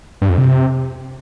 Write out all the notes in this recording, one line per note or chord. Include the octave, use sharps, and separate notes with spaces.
G2
F2
C3